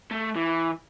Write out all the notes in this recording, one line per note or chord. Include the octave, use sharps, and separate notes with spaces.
A3
E3